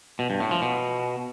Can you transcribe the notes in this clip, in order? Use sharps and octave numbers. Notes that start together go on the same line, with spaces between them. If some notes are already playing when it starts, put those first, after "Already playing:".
B2
G2
A2
F3
B2